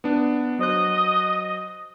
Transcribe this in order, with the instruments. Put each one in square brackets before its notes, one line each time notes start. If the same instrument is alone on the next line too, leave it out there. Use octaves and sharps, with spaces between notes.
[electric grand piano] B3 D4
[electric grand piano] F#3 C5 F#6 [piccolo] D#5